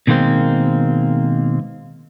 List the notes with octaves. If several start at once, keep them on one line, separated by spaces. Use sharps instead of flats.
B2 D#3 G#3 A#3 C4